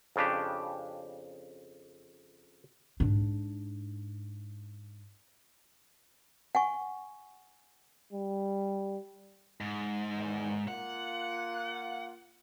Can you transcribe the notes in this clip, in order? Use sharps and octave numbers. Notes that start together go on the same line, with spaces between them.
F2 C#3 D4 G4
G#2 D4
F#5 G#5 C#6
G3
G#2
E2 D#3
A#3 F4 F#5